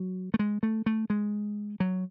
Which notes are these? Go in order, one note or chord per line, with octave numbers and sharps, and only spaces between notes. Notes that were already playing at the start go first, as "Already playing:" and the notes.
Already playing: F#3
A3
G#3
A3
A3
G#3
F#3